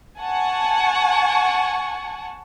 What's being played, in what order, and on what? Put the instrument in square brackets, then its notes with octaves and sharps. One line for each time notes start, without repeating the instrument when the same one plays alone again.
[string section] F#5 G#5 A5 C#6